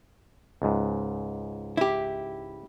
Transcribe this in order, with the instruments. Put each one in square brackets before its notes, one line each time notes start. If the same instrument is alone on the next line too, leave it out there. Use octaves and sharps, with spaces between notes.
[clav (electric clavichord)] C#2 G#2
[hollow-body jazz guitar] E4 G4